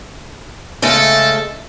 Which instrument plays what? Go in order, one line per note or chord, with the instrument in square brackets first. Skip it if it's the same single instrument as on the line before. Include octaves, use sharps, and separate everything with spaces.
[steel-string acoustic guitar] C#3 G#3 A3 [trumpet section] A4